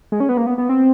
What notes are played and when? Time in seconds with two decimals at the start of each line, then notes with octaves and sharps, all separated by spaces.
0.12 G#3
0.20 C#4
0.29 B3
0.37 A#3
0.46 B3
0.58 B3
0.69 C4